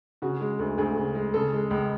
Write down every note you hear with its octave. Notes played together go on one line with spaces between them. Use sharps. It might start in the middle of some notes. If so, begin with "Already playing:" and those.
C#3 F#4
G#3
D2
D2 G#4
C#3
G#3
C#3 A4
G#3
C#2